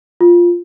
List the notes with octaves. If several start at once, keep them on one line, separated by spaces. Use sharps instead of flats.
F4